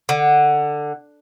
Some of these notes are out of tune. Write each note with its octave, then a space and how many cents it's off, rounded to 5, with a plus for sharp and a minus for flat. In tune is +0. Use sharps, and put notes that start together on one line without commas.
D3 +15